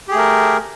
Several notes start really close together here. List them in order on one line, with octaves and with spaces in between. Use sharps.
G4 G#4 A3 A#4